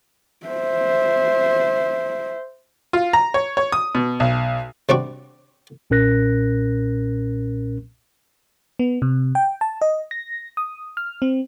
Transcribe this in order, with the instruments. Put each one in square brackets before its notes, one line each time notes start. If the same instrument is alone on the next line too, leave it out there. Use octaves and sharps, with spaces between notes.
[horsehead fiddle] C5 E5
[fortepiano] F4
A#5
C#5
C#5
D#6
B2
B1
[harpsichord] C3 G3 C4 D4 F#4 C#6
[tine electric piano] B1 A#2 C#4 A#4 F#6 A#6
[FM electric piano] B3
C3
G5
A5
D#5
A#6
D#6
F6
C4